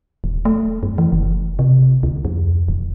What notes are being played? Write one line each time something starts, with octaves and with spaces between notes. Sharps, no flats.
D#1
A3
F#2
E3
F#1
C3
D2
F2
D1